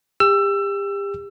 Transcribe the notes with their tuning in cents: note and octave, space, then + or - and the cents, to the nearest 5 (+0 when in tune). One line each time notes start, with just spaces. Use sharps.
G4 +35 E6 +25